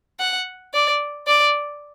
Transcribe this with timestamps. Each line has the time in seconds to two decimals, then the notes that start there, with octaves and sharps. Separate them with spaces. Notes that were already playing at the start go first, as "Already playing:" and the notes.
0.20 F#5
0.73 D5
1.27 D5